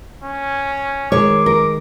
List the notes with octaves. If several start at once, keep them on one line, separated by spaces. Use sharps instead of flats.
C#4
D#3 G#3 C#5 D6
A#4